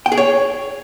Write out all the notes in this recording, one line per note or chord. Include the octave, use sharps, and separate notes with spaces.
G5
G#4
C#5